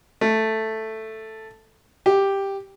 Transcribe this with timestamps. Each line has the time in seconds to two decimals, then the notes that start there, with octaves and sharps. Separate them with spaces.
0.21 A3
2.06 G4